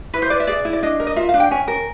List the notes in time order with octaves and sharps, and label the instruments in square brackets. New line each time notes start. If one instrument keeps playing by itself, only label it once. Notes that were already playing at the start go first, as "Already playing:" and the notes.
[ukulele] E4 B4
C5
B4 D5
E5
G#4 D5
E4
D5
D4 D#5
A#4
D#5
F4 E5
F5
D4
G5
C#4 G#5
A#4